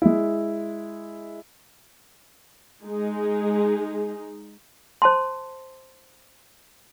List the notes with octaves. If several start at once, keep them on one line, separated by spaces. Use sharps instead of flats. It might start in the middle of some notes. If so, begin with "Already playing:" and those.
G#3 E4
G#3 D#4 G#4
C5 A5 C6